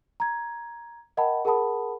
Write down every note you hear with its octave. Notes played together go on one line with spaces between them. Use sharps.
A#5 G#6
A#4 D#5 F#5 G5 A5 B5
G#4 A#4 F#5 A5 B5 D#6